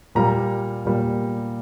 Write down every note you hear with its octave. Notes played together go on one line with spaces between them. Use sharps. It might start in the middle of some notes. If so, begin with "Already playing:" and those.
A#2 G3 A#3 A#5
A#2 G3 A#3